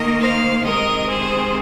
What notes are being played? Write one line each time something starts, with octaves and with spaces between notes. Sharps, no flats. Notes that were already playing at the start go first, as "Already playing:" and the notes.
Already playing: D#3 A#3 A#4 D#5
C5 F5
C3 D#3 G#3 C4 A#4 D#5
G#4 C5